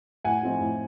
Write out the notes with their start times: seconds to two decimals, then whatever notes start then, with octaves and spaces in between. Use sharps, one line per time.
0.25 A2 F#5 G#5
0.43 F3 A3 C4 D#4
0.60 A2